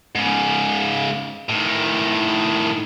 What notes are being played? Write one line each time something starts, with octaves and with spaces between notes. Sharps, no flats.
G#2 C#3
A2 D#3